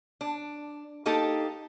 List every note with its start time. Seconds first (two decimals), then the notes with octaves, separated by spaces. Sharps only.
0.21 D4
1.06 A#3 D#4 G4 A4